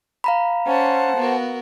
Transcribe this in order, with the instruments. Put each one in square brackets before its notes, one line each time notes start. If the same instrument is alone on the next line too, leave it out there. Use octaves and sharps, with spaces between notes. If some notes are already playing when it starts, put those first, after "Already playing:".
[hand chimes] F5 A#5 B5
[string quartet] C#4 [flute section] C5 F#5 A5
[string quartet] B3 F#4 A#4